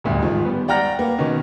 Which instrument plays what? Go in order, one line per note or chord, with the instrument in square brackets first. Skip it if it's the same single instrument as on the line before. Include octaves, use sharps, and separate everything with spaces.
[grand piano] A1 D2 G2
G#2 D#3 F3
G3 B3
D5 F#5 G5 A#5 F6 A#6
A#3 B4
B2 D#3 B3 C#4